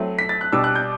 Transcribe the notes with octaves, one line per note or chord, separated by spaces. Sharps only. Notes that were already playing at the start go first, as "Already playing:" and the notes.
Already playing: F#3 A3 C4 E4
B6
A6
F#6
B2 G3 D4 E6
F#6
G6